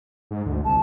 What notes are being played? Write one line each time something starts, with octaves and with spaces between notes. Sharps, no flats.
G#2
D2
C2 A5